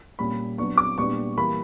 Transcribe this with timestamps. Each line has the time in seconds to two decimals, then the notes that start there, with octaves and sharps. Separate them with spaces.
0.19 A#2 G3 C#4 B5
0.58 F#3 B3 D4 C#6
0.78 D6
0.98 A#2 G3 B3 D4 C#6
1.37 E3 G3 A#3 B5